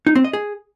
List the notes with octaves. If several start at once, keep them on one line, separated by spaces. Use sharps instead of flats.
D#4
C4
D#5
G#4